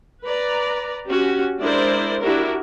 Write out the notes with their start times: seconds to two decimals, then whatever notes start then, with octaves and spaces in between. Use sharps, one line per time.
0.24 B4 D5 A#5
1.09 C#4 F#4 G4
1.59 G#3 D4 E4 A#4 C5 D5
2.22 D4 E4 F#4 G4 A#4